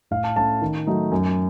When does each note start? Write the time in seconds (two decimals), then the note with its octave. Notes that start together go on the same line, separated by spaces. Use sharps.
0.11 A2 F5
0.24 A5
0.36 A3 C#4 A5
0.62 D#3
0.87 F#3 A3 D#4
1.12 F#2